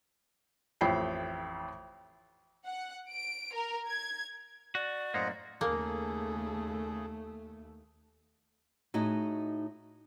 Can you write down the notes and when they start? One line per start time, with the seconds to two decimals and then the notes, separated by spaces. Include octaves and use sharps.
0.81 A1 F2 E4 G5 B5 C7
2.66 F#5
3.10 D7
3.53 A#4
3.87 G#6
4.75 F#4 D5
5.14 F#2 A2 A#3 C5 D#5 F#5
5.61 D#2 C#3 A3 A#3 G#4 A4
8.94 A2 D#4 F#4 G#4 D#5